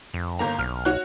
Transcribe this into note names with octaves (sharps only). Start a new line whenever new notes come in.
F2
G1 A#3 A#5
B1 F6
F#4 C#5 F#6